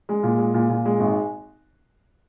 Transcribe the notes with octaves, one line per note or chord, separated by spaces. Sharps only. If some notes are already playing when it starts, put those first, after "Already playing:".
G#3
A#2
G#3
A#2
A#2
G#3
G#1